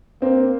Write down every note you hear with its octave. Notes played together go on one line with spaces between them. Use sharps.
A#3 C4